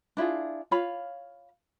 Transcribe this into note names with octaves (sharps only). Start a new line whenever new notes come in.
D4 E4 F4 G#4
F4 C#5 F5 B5